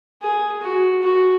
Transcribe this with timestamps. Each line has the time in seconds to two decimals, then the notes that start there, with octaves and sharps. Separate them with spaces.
0.22 G#4
0.62 F#4
1.02 F#4